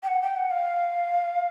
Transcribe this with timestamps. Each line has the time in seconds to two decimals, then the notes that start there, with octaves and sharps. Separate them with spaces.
0.03 G5
0.07 F#5
0.22 G5
0.36 F#5
0.50 F5